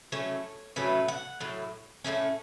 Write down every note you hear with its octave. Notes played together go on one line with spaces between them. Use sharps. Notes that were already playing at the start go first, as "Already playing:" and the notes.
A2 F#3 A3 C#4 C#5
A2 F#3 A3 C#4 B4
F#5
A2 F#3
A2 F#3 A3 C#4